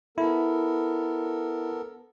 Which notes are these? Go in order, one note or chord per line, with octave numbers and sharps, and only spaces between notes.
B3 E4 A4 A#4